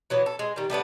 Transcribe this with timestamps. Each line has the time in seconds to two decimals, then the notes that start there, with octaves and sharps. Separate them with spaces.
0.10 E3 F#3 B3
0.26 A4
0.39 G#3
0.56 D#3 G3
0.70 G3 A3 B3 D4